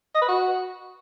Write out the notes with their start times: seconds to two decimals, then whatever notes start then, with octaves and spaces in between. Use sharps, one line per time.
0.15 D#5
0.22 B4
0.28 F#4